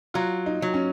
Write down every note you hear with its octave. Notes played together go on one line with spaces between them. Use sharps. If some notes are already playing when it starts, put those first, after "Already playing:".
F#3 F4
D#4
F#3
C#4